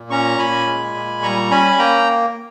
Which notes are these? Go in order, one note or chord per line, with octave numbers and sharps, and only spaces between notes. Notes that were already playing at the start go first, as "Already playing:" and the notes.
Already playing: A#2
C#4 A#5 C#6
A#2 G#5 B5
G#3
A#2
G3 A#5 C#6
C#4 G#5 B5
G#5
A#3 G5 A#5